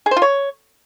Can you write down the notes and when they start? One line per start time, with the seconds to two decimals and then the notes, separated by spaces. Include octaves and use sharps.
0.06 G#4
0.11 C5
0.17 F4
0.22 C#5